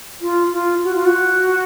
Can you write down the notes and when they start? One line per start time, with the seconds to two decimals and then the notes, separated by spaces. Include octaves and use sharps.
0.22 F4
0.53 F4
0.84 F#4
0.95 F4
1.06 F#4